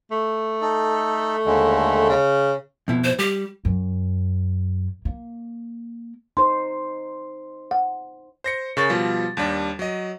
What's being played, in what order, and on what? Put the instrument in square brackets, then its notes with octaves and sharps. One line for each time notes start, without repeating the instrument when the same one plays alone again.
[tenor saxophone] A3
[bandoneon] D#4 A4
D#2 D3 G#3
[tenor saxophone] C#3
[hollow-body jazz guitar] F2 B2 E4
[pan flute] C5
[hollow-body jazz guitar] G3 [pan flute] G4
[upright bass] F#2
A#3
[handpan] D#4 C5 [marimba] C6
[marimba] F#5
[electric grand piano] C5 A#6 C#7
C#3 A#4 C#6 A6
B2 F3 G3
D#2 G3 D4
F#3 D#5